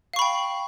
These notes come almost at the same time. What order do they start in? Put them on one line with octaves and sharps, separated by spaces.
F5 C#6 B5 G5